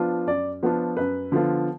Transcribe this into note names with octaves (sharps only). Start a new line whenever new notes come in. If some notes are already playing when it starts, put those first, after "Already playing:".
Already playing: F3 B3 D4 F4
F#2 D5
F3 B3 D4 F4
F#2 B4
D3 F3 B3 F4